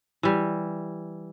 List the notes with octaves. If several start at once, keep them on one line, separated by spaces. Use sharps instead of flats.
E3 G3